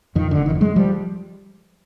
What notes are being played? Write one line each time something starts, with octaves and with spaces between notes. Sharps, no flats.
F2 D#3
F1 D3
D#3
D3
F#3 G#3
F3 G3